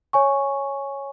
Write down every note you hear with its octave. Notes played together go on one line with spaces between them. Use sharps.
C#5 G#5 C#6